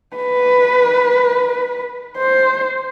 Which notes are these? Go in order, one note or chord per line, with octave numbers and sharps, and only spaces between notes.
B4
C5